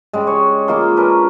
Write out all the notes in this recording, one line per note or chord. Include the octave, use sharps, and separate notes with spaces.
C#3 G3 G#3
C#5
G#3 A#3 F4 C6
C#4 D4 A#4 B4